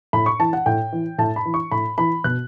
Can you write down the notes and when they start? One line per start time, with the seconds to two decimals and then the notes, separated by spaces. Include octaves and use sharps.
0.13 A2 B5
0.26 C#6
0.39 E3 A5
0.53 F#5
0.66 A2 G5
0.92 E3
1.18 A2 A5
1.36 B5
1.45 E3
1.54 C#6
1.71 A2 B5
1.98 E3 B5
2.24 B2 F#6